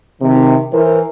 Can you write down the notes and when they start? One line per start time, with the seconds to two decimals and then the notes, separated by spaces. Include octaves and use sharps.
0.22 C3 D#3
0.73 E3 A#4 C5